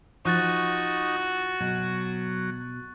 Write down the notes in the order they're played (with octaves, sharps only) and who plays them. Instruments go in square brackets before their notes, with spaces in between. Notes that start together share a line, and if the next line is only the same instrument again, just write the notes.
[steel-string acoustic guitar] F3 [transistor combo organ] D#4 [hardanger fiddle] F#4 [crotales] C#6 F#6 A6
[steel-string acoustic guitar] B2 [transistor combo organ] F#3